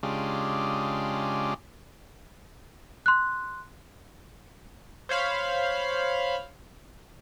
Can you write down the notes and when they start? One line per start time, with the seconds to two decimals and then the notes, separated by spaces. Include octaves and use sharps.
0.03 C#3 G#3 D4 F4 G4
3.06 C6 F#6
5.09 C5 C#5 F5 B5